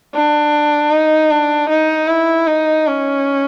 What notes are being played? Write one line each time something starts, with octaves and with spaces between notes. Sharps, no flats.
D4
D#4
D4
D#4
E4
D#4
C#4